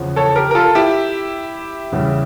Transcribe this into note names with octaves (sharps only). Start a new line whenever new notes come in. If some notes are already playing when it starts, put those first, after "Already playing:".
Already playing: E2 C#3 F3
A4 C#5
G4 A#4
A#4
F4 A4
E4 G4
E2 C#3 E3 G3